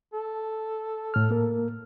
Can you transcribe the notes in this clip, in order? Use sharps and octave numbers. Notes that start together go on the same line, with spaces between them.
A4
A2 F6
A#3 A#4